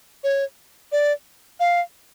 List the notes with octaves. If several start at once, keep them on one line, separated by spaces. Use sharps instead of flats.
C#5
D5
F5